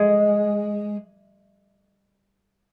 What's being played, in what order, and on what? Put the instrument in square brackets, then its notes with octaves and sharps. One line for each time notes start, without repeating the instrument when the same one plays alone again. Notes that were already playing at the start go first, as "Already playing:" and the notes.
Already playing: [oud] G#3